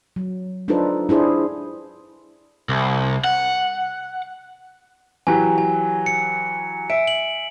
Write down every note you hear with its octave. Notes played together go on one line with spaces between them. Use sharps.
F#3
D4 D#4 F4 A4 B4 C5
D4 E4 G#4 C5
C2
F#5
E3 F#3 G4 G#5
G#5
C#7
E5 D7
F#7